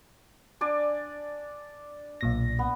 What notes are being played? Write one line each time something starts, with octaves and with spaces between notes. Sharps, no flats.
D4 D5 G#5
B1 A#2 A#6
B3